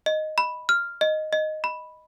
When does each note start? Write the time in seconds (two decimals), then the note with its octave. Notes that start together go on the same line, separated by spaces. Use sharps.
0.06 D#5
0.38 B5
0.69 F6
1.01 D#5
1.33 D#5
1.64 B5